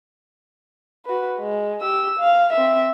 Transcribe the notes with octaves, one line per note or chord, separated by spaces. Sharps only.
F#4 B4
G#3
G4 E6
F5
C4 E5